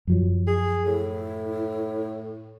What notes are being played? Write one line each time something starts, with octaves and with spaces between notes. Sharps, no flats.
F#2 F3 F#3
G#4
A2 E4